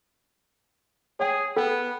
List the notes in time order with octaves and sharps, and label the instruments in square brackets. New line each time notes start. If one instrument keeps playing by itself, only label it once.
[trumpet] G#4 [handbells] C#5 G5
[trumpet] B3 [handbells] A4 G5